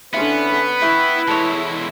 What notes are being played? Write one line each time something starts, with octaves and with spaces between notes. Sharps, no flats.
D3 B3 C#4 E4 B4 C6
E4 E5 G5 C#6
E2 G#3 A4 C#5